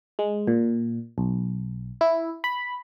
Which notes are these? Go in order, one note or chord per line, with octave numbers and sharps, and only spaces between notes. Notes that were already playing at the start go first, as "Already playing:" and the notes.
G#3
A#2
B1
E4
B5